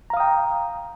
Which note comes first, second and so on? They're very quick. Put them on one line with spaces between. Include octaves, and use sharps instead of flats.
A#5 F5 D#6 G5